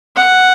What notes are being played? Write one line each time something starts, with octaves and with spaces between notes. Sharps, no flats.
F#5